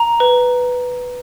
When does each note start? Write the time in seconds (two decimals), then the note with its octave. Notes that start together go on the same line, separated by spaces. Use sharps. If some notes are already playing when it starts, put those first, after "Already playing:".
Already playing: A#5
0.20 B4